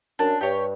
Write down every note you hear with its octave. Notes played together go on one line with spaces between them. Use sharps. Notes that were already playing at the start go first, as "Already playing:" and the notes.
F#2 D4
G2 G4 C#5